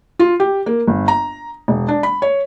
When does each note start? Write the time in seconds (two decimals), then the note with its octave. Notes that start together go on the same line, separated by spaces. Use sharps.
0.19 F4
0.40 G4
0.66 A#3
0.87 G1
1.08 A#5
1.68 E1
1.88 D4
2.03 B5
2.22 C#5